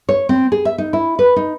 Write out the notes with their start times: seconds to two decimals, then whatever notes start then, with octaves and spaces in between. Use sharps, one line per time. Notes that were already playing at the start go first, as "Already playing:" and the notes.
0.09 C#5
0.29 C4
0.52 G#4
0.65 E5
0.78 D#4
0.93 E4
1.19 B4
1.36 D#4